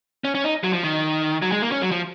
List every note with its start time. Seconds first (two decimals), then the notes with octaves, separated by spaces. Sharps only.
0.24 C#4
0.35 C#4
0.44 D#4
0.64 F#3
0.73 F3
0.84 D#3
1.42 F#3
1.52 G#3
1.62 A#3
1.72 C#4
1.81 F#3
1.91 F3